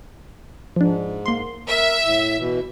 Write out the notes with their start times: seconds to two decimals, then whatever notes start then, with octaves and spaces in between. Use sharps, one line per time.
0.76 G#2 F3 D4
1.26 A#3 C6
1.69 A#4 E5
2.03 A2
2.38 B2 E3